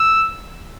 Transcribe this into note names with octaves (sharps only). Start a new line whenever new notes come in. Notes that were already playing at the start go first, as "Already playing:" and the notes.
Already playing: E6